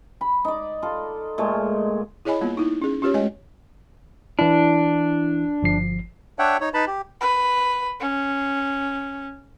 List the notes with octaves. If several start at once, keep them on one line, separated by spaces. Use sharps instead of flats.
B5
D#4 D5
F4 A4
A#2 G#3 A3
E4 G#4 C#5 D#5 G#5 B5
G3 A#3 B3 F4
D#4 E4
C#4 G#4
C#4 F4 G4 B4 C#5
G#3 A3 C#5 D#5 G#5
E3 D4 E4
G1 F3 C7
D4 C#5 E5 F#5 G5
D#4 C#5
D#4 B4 A5 B5
G4
B4
C#4